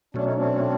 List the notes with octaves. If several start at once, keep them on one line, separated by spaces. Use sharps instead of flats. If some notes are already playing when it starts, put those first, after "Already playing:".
B2 F#3 A3 C#4 D4
D#4
C4 D4